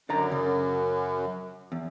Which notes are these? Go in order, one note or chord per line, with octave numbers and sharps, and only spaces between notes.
F#2 D3 D5 A#5
C#3
E2